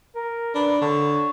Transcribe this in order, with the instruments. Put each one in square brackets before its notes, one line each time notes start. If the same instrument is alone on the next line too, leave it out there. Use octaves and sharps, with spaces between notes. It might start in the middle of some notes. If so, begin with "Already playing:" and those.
[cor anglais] A#4
[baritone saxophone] D4 [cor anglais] B4
[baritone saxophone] D3 [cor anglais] C#5